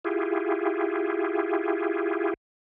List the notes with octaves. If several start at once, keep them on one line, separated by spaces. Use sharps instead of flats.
E4 F4 G4 G#4